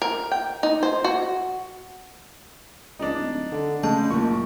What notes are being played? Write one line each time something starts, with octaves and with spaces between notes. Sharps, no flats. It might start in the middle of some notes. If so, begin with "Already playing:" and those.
A#4
G5
D#4
C5
F#4
C#2 D4 D#4
D1
D3
C#3 G#3 A3 A5
F#1 A#2 C#6